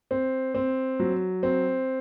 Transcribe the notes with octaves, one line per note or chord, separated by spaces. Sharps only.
C4
C4
F#3
C4